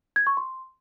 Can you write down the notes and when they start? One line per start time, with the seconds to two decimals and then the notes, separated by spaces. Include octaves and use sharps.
0.16 G#6
0.27 C#6
0.37 C6